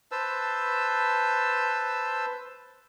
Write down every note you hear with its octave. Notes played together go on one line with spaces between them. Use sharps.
B4 C5 A5 E6